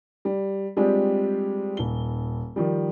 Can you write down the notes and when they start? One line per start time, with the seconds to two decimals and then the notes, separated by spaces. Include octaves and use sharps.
0.25 G3
0.77 G3 G#3 C4 D4 F4 G4
1.77 D#1 G7
2.56 D#3 F3 G3